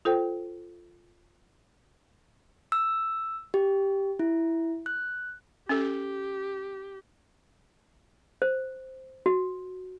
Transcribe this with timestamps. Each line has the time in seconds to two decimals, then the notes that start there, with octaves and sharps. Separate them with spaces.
0.05 F4 A4 C5 G5
2.72 E6
3.54 G4
4.19 E4
4.86 F#6
5.69 C#4 G4 A4
8.42 C5
9.26 F#4